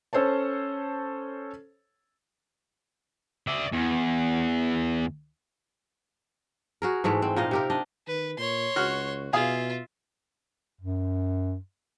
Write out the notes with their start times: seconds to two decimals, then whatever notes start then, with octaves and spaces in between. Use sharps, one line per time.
0.13 C#4 A4 C5 C#5 A5
3.48 D5 E5
3.73 E2
6.82 F#4 G#4 A#4
7.04 G#2 E3 G#3 A3
7.22 C4
7.36 A#2 D#4 D#5 F5
7.51 C3 G4 A#4
7.70 D4 D#5
8.08 D#3 B4
8.38 A#2 C#5 C6
8.76 C#2 F#4 F6
9.33 B2 F4 G#4 E5 F5 D#6
10.81 F#2